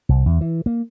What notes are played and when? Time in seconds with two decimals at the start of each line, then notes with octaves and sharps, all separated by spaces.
0.09 C2
0.26 E2
0.41 E3
0.66 A#3